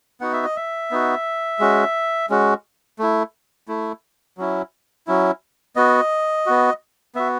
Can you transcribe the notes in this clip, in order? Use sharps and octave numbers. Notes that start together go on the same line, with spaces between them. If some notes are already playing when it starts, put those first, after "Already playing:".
B3 D#4 F#4 F#5
E5
D#5
E5
B3 D#4 F#4
G#3 C#4 F#4
G#3 C#4 F#4
A3 E4
A3 E4
F#3 C#4 E4
F#3 C#4 E4
B3 F#4 D#5
B3 F#4
B3 F#4 E5